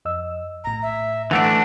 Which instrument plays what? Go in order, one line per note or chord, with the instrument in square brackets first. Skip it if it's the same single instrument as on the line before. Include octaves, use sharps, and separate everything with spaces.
[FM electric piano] F2 D#5 E6
[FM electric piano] A#1 A2 [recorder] A#5
[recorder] E5
[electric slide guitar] E3 A3 D4 [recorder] F#5